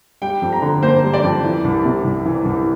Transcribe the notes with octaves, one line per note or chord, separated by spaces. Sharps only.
G3 G5
F2
A#5
D3
A#3 C5
G3
D5
F2
E3
C2
C3
C2
E3
C2